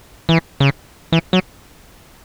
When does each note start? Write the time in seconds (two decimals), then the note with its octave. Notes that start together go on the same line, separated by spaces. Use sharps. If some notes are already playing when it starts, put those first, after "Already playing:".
0.29 E3
0.60 C#3
1.12 E3
1.33 F#3